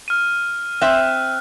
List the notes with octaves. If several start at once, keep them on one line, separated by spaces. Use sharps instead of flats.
F6 D#7
C4 E5 F#6